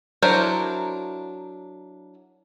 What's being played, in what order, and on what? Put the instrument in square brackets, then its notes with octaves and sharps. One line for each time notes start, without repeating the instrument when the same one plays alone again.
[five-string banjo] F#3 D4 E4 A#4 C5